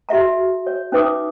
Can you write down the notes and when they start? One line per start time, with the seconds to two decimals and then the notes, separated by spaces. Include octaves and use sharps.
0.09 F#4 G#4 E5 A#5
0.67 C#5
0.92 C#4 D#4 B4 E5 D6 D#6